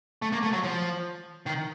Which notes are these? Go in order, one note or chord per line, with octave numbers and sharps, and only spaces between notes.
A3
A#3
A3
F#3
F3
D#3